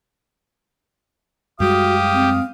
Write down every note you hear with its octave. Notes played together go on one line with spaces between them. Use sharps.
F#2 G3 G#3 F#4 G4 F5 D#6
C4